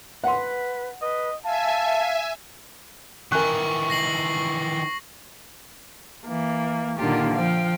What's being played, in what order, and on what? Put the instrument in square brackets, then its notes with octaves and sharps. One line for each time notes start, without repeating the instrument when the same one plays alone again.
[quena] B4 [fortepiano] F#5 C6
[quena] B4 [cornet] D#5
[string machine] E5 G#5 [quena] F5 [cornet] A5
[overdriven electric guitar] D#3 E3 [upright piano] A#4 G#5 F#6 [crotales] C#6
[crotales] A#6 C7 F#7
[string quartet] E3 A#3
A#2 D3 D#3 A#3 F4 G4
F3 F5 G5